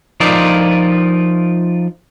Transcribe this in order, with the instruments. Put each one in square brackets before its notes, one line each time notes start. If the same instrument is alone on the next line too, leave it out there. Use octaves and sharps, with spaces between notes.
[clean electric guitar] F3 D#4 F4 A#4 D5